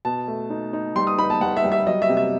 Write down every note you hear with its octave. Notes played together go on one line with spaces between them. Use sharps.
B2 A5
A3
D#4
D#4
G3 C6
D#6
D#4 B5
A5
G3 F#5
E5
G3
E5
F#3 D#5
E5
C3
E5